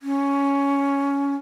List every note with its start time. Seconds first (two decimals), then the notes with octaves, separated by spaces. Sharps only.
0.02 C#4